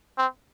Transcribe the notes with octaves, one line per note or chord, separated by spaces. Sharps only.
C4